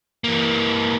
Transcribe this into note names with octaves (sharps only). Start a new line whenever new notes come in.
E3 A#3